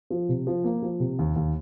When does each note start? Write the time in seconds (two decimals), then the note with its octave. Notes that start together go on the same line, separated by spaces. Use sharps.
0.10 F3
0.29 C3
0.47 F3
0.64 A#3
0.82 F3
1.00 C3
1.19 D#2
1.36 D#2